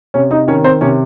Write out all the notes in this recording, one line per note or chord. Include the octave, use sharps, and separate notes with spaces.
C3 C#4 C#5
D#4 D#5
D#3 C#4 C#5
C4 C5
C3 C#4 C#5